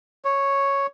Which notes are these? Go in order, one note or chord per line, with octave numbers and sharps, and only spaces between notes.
C#5